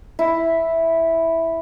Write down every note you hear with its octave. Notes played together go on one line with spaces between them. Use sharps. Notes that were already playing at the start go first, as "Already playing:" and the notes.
E4